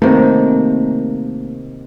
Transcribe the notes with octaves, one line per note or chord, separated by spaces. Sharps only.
C3 D#3 A3 A#3